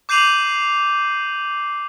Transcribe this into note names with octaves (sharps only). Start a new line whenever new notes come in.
D6 G6 C7 D#7 F7 F#7